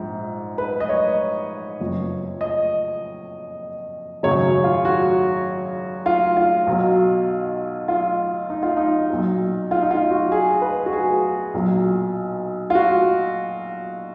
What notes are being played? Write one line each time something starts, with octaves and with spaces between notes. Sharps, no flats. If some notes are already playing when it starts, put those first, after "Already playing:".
Already playing: A#1 G#2
B4
D#5
C#5
F#1 F2 F3
D#5
G#1 F#2 C#3 F#3 C#5
F4
F#4
F4
F4
B1 B2 F#3
F4
D#4
F4
D#4
B1 A#2 F#3
F4
D#4
F4
F#4
G#4
B4
F#4
G#4
B1 A#2 F#3
F4
F#4